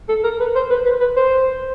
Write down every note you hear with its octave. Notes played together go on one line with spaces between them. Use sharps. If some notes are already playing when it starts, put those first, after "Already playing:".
A4
A#4
B4
C5
B4
B4
B4
C5